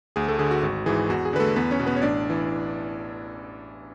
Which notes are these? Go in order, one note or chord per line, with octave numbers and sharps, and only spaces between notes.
D2 G#4
A3 A4
D3 G#4
F#4
G#1 F#4
G#2 E3 G#4
E2 F#4
G#4
D3 B4
A3 A4
E2 B3 B4
C#4 C#5
B2
B3 B4
C#5
A1 D4 D5
E3